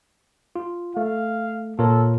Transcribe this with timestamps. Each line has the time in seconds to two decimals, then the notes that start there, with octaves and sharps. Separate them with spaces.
0.56 F4
0.97 A3 F5
1.79 A#2 F4 A4 A#4 C#5